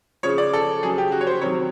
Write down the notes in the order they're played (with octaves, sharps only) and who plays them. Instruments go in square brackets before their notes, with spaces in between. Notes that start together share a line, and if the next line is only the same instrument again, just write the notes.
[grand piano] C#3 F3 C#5
D5
A4
C#3 F#3 G#4
G4
F#4
C#5
C5
C3 D#3 F#3 C#5